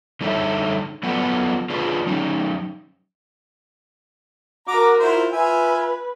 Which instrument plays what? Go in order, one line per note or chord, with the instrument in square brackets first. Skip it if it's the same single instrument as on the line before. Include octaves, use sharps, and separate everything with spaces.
[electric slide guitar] D3 G3 D#4 A4 C#5 E5
F#3 B3 F4 A4 B4 F#5
D4 F4 G#4 B4
F#3 C#4 D#4
[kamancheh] F#4 A#4 [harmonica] A#5 D6
[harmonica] E4 F4 C5
[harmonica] F4 E5 G#5 [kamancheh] B4